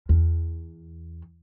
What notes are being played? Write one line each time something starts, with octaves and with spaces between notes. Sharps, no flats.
E2